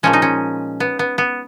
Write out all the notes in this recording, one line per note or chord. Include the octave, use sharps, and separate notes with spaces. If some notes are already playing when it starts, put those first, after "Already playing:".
A#2 F3 G#3 C#4
D#4
C#4
B3
B3
B3